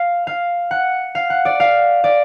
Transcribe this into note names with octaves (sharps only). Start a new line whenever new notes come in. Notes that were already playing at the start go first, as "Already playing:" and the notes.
Already playing: F5
F5
F#5
F5
F#5
D5
F5
D5